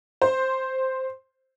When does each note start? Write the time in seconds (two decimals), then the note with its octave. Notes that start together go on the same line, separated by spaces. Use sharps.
0.22 C5